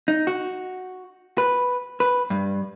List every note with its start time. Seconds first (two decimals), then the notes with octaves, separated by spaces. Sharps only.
0.08 D#4
0.27 F#4
1.38 B4
2.00 B4
2.30 G2